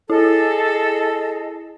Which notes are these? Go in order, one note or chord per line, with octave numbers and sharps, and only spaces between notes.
E4 G#4 A4 D#5 A5